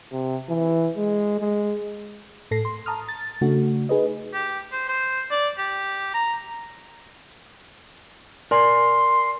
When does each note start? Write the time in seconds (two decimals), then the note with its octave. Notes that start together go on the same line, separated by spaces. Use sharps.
0.12 C3
0.49 E3
0.96 G#3
1.40 G#3
2.51 A2 A4 A#6 C7
2.65 C6
2.86 A5 A#5 D#6 F6
3.09 A6
3.41 C#3 A3 D4 F#4
3.89 D#4 G#4 B4 D#5
4.34 G4
4.72 C5
4.89 C5
5.31 D5
5.58 G4
6.14 A#5
8.51 A#4 D5 G#5 C6